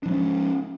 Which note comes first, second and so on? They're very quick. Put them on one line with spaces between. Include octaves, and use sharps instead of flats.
D4 F3 G#3 C#4